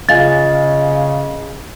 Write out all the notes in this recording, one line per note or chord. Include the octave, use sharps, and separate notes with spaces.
C#3 G#3 F4 F5 G#5 A6